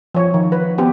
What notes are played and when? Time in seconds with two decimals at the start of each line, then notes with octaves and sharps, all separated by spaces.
0.14 F3 C#5
0.34 D#3
0.52 B4
0.78 B3 C4 G4